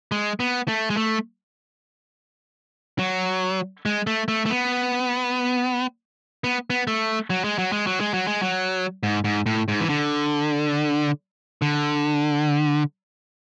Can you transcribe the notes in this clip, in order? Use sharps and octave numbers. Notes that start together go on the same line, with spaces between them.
G#3
B3
A3
G#3
A3
F#3
G#3
A3
A3
A3
B3
B3
B3
A3
F#3
G#3
F#3
G#3
F#3
G#3
F#3
G#3
F#3
G#2
G#2
A2
G#2
E3
D3
D3